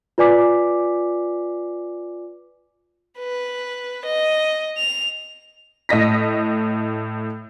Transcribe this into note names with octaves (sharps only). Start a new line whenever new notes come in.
F4 B4 D5 G#5 D6 B6
B4
D#5
F7
A2 D#5 A#6 B6